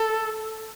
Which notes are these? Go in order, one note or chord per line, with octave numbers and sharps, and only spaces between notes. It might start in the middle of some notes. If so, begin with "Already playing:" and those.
Already playing: A4